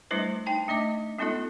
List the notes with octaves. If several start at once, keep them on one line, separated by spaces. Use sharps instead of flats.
G3 A3 D4 E4 B4 C5
D#4 G5 A5
A3 D4 D#5 D6
G#3 B3 C#4 D#4 F4 A4